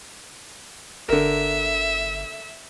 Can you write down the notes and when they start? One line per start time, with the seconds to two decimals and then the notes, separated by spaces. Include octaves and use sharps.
1.09 G1 D3 A#4 E5